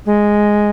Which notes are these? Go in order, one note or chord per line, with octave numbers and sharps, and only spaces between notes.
G#3